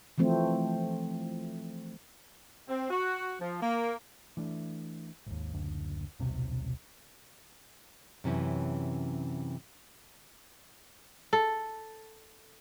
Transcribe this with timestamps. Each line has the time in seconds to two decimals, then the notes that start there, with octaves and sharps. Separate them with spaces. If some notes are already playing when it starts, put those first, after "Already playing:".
0.18 E3 F3 A3 C4
2.69 C4
2.90 F#4
3.40 F3
3.62 A#3
4.37 E3 A3 D4
5.26 G#1 D#2
5.53 F#1 D2
6.20 D#1 B1 C3
8.24 F#2 C3 E3 C#4
11.33 A4